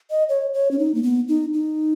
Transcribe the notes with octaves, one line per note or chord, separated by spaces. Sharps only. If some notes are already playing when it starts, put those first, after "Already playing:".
D#5
C#5
C#5
C#4
D#4
A#3
B3
D#4
D#4